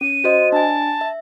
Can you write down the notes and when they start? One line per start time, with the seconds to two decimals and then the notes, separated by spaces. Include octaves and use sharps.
0.01 C#4 D#7
0.24 F#4 C5 D#5
0.52 D4 G#5 A5
1.01 E5